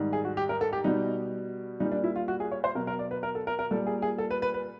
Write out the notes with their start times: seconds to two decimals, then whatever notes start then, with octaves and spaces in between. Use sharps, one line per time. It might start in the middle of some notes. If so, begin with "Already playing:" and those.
Already playing: G#2 D#3 G3
0.13 G#4
0.25 F#4
0.37 G4
0.49 A#4
0.61 A4
0.73 G4
0.84 B2 G3 D#4
1.80 A#2 G3 D#4
1.92 D4
2.04 E4
2.16 F4
2.28 F#4
2.40 G#4
2.52 C#5
2.64 C5
2.75 B2 F#3 A#4
2.87 A#4
2.99 D5
3.11 B4
3.23 A#4
3.35 A4
3.47 A#4
3.59 A#4
3.71 A#2 G3 A4
3.87 G#4
4.02 G#4
4.18 A4
4.31 B4
4.42 B4
4.54 B4